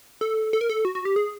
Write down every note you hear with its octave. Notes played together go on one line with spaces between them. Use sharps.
A4
A4
A#4
A4
F#4
F#4
G4
G#4